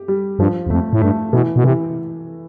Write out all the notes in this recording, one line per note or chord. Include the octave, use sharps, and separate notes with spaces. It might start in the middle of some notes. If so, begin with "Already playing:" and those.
Already playing: G4
G3
G2 F3
E2
F2 A3
A2
G2 A3
B2 E3
B2
C3 E3